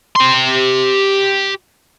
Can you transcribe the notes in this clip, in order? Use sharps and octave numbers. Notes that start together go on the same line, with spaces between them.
G4 C6